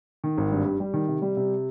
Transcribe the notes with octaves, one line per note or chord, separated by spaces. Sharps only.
D#3
G#1
G2
G3
G3
D#3
C3
G3
C3